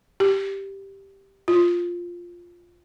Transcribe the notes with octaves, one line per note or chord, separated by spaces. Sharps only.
G4
F4